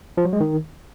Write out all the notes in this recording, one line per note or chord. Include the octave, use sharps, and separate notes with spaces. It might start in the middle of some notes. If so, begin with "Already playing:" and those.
F3
F#3
G#3
D#3